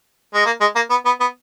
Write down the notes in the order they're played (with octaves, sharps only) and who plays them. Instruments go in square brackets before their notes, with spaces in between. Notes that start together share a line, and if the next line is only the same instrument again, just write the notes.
[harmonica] G#3
A#3
G#3
A#3
B3
B3
B3